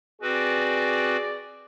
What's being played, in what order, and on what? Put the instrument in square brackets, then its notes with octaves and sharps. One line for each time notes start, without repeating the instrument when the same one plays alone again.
[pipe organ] C4 F#4 B4 [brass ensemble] G#4 D5